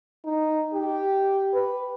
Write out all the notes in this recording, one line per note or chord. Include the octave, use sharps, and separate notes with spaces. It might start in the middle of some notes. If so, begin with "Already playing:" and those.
D#4
G4
B4